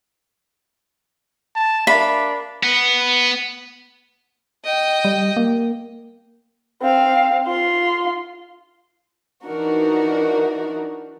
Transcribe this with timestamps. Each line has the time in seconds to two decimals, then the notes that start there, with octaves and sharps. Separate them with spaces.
1.56 A5
1.87 D4 A#4 E5 F5 B5
2.63 B3
4.64 D#5 G5
5.05 G3
5.37 A#3
6.82 C4 F5
7.47 F4 C6
9.45 E3 D4 D#4 F#4 A#4